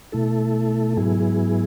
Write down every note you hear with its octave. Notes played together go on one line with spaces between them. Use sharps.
B2 A3 E4 A4
G#2 F#3 B3 E4 G#4